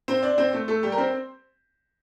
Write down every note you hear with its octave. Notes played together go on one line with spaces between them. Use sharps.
C4 C5
D4 D5
C4 C5
A3 A4
A3 A4
G3 G4
A#4
C4 C5